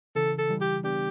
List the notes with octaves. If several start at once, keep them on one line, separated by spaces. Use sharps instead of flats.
C#3 E3 A4
A4
E3 G3
G4
B3 D4 G4